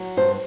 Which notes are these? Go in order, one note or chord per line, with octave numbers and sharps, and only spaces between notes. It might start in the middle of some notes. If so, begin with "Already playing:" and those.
Already playing: F#3
G2 C5